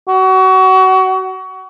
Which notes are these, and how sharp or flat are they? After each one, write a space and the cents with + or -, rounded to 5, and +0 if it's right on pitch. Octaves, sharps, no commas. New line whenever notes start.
F#4 +25